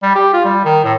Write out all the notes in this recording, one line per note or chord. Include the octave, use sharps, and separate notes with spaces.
G3
G4
F4
G3
D#3
A2